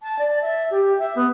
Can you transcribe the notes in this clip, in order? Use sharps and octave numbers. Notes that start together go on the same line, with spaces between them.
A5
D5
E5
G4
E5
B3